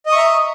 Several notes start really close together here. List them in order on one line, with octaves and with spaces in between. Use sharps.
D#5 D#6 C#6 E5 A#5